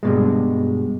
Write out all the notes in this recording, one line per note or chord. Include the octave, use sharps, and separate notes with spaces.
G2 B2 G#3